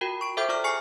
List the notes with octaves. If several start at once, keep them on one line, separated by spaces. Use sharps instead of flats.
F4 F#4 A#4 G5 B5
C#6 D7
A4 C5 E5 G5 D6 G6
F4 D5 D6 F6
G#4 G#5 C#6 F6 C7 C#7